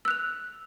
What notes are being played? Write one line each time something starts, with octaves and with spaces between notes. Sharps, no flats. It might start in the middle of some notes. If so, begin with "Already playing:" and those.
E6 F#6 F7